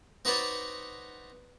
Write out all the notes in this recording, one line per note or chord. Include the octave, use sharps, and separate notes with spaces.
C4 D#4 F#4 B4 C#5 D5